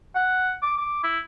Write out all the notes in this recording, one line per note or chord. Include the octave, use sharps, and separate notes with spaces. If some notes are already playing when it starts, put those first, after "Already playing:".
F#5
D6
D6
E4